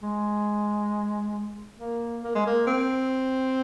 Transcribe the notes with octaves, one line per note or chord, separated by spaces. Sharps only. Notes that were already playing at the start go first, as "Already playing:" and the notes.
G#3
A#3
A#3
G#3
A#3
C4